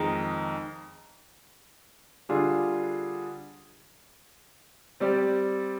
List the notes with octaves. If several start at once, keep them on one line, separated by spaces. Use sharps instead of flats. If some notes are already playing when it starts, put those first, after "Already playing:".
Already playing: F2 D#3 G#3 D#4
D3 G3 D4 F4 G#4
G3 C4 G4 D5